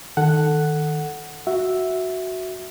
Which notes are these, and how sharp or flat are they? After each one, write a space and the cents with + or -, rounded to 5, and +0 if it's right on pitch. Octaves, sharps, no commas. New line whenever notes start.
D#3 +0 A4 +0 F#5 +0
F#4 +0 E5 +0